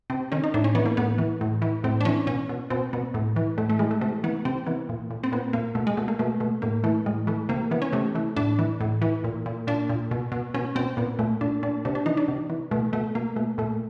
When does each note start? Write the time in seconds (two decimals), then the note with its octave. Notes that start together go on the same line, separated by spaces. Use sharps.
0.10 C3 C4
0.32 D#3 C#4
0.44 D#4
0.54 A2 D4
0.64 C#4
0.75 E3 B3
0.86 A#3
0.97 A2 B3
1.18 E3
1.41 A2
1.62 E3
1.84 A2 C4
2.01 D4
2.05 E3 C#4
2.27 B2 C#4
2.49 B2
2.70 B2 C4
2.93 B2 B3
3.14 A2
3.36 E3
3.58 A2 A3
3.70 A3
3.79 E3 G#3
3.91 A3
4.01 C3 A3
4.24 E3 B3
4.45 C3 C4
4.67 E3 B3
4.89 A#2
5.10 A#2
5.24 C4
5.32 A#2 B3
5.53 A#2 A#3
5.75 B2 A3
5.87 G#3
5.97 B2 A3
6.08 A#3
6.19 B2 A3
6.40 B2 A3
6.62 A2 A#3
6.84 E3 A3
7.06 A2 G#3
7.27 E3 A3
7.49 C3 A#3
7.71 E3 B3
7.82 C#4
7.93 C3 A3
8.15 E3 A3
8.36 A2 D4
8.59 E3
8.80 A2
9.02 E3
9.24 A#2
9.46 A#2
9.67 A#2 D4
9.89 A#2
10.11 B2
10.32 B2
10.54 B2 C#4
10.75 B2 C4
10.97 A#2 B3
11.19 A#2 A3
11.41 A#2 D4
11.63 A#2 D4
11.85 C3 D4
11.95 D4
12.06 E3 D#4
12.17 D4
12.28 C3
12.50 E3
12.71 B2 A3
12.93 B2 A3
13.15 B2 A#3
13.36 B2 A3
13.58 A#2 A3